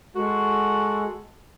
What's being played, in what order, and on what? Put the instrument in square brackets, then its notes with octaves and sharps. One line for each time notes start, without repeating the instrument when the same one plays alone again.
[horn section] G#3 F#4 A4